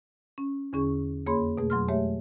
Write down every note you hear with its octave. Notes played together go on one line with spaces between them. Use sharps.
C#4
E2 D3 C#4 G#4 C#6
F2 A#3 G#4 C#5 B5 C6
B2 A3 G#4
F2 F#3 C6 F6
G#3 A3 G4 C#5 E5